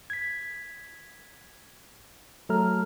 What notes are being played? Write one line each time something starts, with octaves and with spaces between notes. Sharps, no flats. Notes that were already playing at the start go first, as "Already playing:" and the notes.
G#6 B6
F#3 A3 A4 A#5 F6